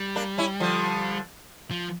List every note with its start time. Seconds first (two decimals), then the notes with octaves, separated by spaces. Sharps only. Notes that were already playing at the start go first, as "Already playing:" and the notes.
Already playing: G3
0.16 A#3 D4
0.38 C#4 E4
0.60 D3 F3
1.71 F3